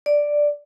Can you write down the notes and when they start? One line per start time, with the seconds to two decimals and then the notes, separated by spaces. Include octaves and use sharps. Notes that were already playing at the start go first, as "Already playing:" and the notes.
0.06 D5